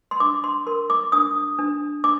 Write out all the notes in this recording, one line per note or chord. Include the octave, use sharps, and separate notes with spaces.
C6
D4 D6
C6
A#4 C6
D6
D4 D#6
D4
D4 D6